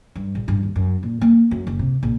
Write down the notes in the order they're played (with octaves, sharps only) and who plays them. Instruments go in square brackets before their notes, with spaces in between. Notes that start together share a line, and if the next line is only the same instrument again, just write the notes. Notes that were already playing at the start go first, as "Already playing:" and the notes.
[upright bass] G2
A#1
G2
D#2
F#2
A#2
A#3
F#2
F#1
C3
A#1